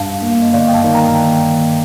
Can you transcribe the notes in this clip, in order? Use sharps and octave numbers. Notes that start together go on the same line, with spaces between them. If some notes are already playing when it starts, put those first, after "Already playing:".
Already playing: G2 F5 A5
A#3
D#5
G1 D5 F5
G5
F5 A5
D#3
G5 A#5